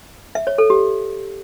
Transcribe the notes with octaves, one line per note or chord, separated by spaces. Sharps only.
E5
C#5
A4
G4